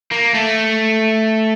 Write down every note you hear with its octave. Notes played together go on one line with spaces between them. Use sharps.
A#3
A3